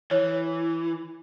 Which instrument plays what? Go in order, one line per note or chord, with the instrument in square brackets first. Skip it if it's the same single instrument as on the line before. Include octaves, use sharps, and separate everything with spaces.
[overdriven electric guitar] E3 [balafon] C#5